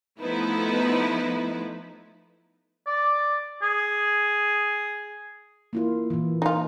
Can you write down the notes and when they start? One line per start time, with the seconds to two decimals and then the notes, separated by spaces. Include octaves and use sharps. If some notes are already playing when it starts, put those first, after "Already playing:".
0.20 F3 A3 B3 D#4 E4 B4
2.87 D5
3.62 G#4
5.73 A#3 E4 F4
6.10 A#2 E3
6.42 D#4 F4